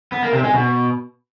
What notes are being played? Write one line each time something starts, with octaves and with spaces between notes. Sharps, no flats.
B3
A#3
C3
G#3
B2